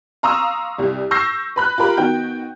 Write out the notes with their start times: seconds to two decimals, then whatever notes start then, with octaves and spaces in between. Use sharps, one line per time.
0.23 F5 A#5 C6 C#6 D#6 E6
0.78 C2 G3
1.11 C#6 E6 G6 A#6 C7
1.56 B4 B5 F#6
1.78 F4 G4 A#4 B5
1.97 D#3 B3 F#4 G5 G6